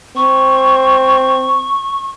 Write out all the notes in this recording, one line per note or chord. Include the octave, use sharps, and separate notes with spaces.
C4 C#6